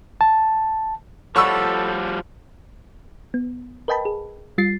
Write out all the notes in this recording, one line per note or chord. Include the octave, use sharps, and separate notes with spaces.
A5
F3 G3 A4 C#5 F#5 B5 C#6 E6
B3
A#4 B4 D#5 G5 A5 B5
G#4
G3 F4 A6 C7